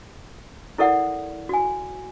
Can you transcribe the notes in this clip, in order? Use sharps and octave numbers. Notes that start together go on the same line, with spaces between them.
E4 A4 A#4 D5 E5 F#5
F#4 G#5